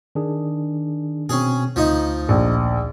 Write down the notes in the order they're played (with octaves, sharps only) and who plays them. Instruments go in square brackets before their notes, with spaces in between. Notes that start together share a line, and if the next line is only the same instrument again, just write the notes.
[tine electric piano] D#3 D4 G#4
[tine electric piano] B2 C4 [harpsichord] C#4 G#4
[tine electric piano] D2 [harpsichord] F3 D#4
[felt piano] A#1